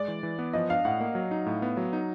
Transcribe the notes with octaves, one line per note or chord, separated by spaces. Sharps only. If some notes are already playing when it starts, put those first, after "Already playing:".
Already playing: G#3 D5
E3
E3
B3
F3 D#5
D4 F5
A2 F#5
A#3
F#3
D#4
A2
B3
F#3
D#4